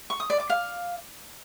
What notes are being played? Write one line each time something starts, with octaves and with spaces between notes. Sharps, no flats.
C#6
D#6
D5
D6
F5